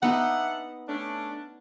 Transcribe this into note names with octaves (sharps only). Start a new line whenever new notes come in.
B3 D4 D#4 E5 F#5
A3 C#4 D4